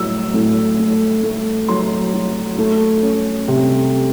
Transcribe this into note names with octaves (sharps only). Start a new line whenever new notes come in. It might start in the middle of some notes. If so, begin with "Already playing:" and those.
Already playing: A2 F#3 E6
A2
A3
A3
F#3 C6
F#3
A3
C#4
C3